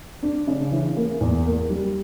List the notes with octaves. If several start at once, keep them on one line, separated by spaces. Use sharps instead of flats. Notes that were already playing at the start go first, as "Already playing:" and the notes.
D4
C#3
E3
A#3
E2
A#3
G3